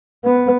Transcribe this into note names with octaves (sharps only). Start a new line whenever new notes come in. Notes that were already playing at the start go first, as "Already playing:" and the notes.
B3